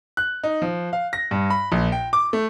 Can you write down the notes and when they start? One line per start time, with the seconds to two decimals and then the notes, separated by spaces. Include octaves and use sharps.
0.17 F#6
0.43 D#4
0.62 F3
0.93 F5
1.13 A#6
1.31 G2
1.50 B5
1.72 A#1
1.92 G5
2.13 D6
2.33 A3